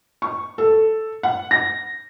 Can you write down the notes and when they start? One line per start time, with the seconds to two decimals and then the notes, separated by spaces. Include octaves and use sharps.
0.22 C#6
0.58 A4
1.23 F#5
1.51 A#6